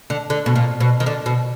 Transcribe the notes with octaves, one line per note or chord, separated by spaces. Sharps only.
D3
D3
B2
A#2
B2
D#3
D3
B2